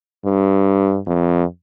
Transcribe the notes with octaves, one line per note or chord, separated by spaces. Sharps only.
G2
F2